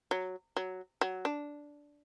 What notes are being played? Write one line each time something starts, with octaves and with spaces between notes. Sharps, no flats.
F#3
F#3
F#3
D4